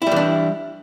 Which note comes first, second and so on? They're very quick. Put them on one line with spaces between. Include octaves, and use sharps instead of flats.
E4 G3 E3 D4